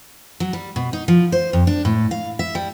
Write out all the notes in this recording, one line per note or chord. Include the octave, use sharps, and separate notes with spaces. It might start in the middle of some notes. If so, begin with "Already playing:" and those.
F#3
G3
B2
D#4
F3
C5
F2
D4
A2
F5
E5
G3